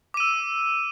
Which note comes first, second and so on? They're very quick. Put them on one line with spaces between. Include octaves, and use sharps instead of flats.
D6 D#7 E6